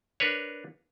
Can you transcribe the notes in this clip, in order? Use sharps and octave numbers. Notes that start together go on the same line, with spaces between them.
D4 A#4 B4 C#5